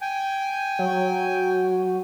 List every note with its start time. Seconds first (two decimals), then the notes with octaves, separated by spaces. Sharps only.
0.01 G5 G#5
0.79 F#3